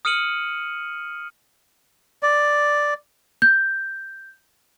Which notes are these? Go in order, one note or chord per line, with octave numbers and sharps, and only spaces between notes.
D#6 F6 C#7 D#7 F#7
D5
G6